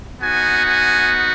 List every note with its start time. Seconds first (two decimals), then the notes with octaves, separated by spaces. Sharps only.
0.20 B3 D#4 F#4 G#5
0.66 G#5